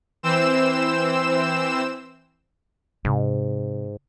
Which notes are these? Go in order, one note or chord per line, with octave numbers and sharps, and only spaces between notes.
E3 C4 C5 E6 E7
G#2 C3